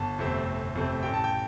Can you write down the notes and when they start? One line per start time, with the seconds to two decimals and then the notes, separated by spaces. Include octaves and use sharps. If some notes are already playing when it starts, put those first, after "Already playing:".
Already playing: G1 A5
0.19 F2 C3 A3 C4
0.46 G1
0.75 F2 C3 A3 C4
1.03 A1 G5
1.14 A5
1.24 G5